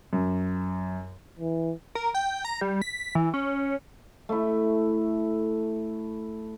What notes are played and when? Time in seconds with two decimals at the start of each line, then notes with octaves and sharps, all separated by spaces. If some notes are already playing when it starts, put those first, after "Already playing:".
0.13 F#2
1.39 E3
1.95 A#4
2.14 G5
2.45 A#5
2.61 G3
2.82 B6
3.15 E3
3.34 C#4
4.29 A3 E4